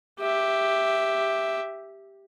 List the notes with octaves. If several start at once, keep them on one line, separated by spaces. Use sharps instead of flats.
G4 E5